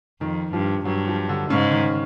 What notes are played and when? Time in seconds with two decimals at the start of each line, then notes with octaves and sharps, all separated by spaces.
0.20 F2 D#3
0.53 G2 F3
0.85 G2 F#3
1.08 F3
1.29 D3
1.50 G#2 C#3
1.71 D#3